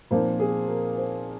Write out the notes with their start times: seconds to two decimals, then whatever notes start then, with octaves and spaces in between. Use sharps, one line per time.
0.11 A#2 F3 C4 D#4 C5
0.40 G#4
0.68 A#4
0.97 C5